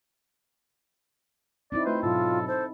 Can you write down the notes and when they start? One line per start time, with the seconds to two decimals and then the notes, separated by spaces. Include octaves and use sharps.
1.72 C4 D#4 E4 D5
1.86 A3 F4 B4 C5
2.03 G#2 B2 F#3 F4 A4
2.47 A4 C5